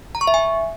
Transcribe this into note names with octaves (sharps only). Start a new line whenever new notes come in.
A#5
C#6
E5
G#5